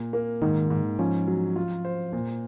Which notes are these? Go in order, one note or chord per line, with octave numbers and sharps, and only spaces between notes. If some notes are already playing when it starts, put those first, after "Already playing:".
Already playing: A#2
A#3
G#2 D#3
G#2
F3 C#4
F#3
F4
C5
A#2